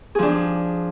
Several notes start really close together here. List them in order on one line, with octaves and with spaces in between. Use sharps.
G#4 F3 D4